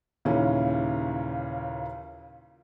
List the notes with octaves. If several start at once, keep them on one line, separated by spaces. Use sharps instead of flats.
D#2 A#2 C#3 E3 C#4